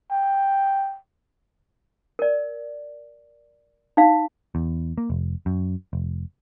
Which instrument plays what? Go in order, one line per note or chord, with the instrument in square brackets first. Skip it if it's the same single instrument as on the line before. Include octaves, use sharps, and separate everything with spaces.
[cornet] G5
[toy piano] A#4 D5
D#4 F5
[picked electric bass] E2
A#3
F1
F#2
F1